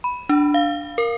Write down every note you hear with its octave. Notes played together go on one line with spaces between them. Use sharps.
B5
D4
F5
A#4